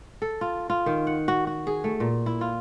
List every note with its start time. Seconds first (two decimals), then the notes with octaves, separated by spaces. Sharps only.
0.22 A4
0.41 F4
0.70 F4
0.86 D#3
1.07 F#5
1.28 F#4
1.47 F#4
1.67 G#4
1.84 A3
2.00 A#2
2.26 E4
2.41 F4